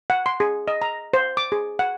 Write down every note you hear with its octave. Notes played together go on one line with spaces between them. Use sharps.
F#5
C6
G#4
D#5
A#5
C5
D6
G#4
F#5